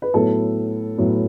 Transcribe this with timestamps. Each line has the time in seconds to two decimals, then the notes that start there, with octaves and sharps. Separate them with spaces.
0.02 B4
0.14 A2 F#3 B3 A4
0.97 A2 F#3 B3